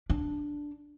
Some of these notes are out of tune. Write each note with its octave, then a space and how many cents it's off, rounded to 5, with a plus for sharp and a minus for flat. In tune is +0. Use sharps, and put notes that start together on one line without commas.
D4 +0